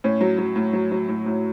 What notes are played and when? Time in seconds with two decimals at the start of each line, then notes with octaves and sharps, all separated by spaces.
0.04 A2 C#4
0.21 F#3
0.38 F#3
0.56 A2
0.73 F#3
0.92 F#3
1.09 A2
1.26 A2